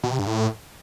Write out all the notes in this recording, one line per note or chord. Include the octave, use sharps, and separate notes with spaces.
B2
C3
G2
A2